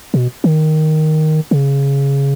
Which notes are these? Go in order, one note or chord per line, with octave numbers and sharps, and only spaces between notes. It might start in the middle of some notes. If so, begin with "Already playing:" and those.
B2
D#3
C#3